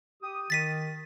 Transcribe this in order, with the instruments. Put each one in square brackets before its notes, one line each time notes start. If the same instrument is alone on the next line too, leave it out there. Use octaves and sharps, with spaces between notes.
[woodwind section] G4 D#6
[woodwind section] D#3 [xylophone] A6 B6 D#7